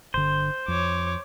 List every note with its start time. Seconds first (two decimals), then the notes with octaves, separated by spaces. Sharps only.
0.14 G1 D3 C5
0.68 F2 C#5 D6